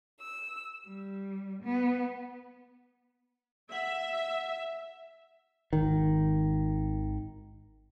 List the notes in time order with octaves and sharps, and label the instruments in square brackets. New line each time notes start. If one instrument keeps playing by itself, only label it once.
[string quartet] E6
G3
B3
[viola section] E5 [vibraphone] F#5
[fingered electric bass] G#1 D#3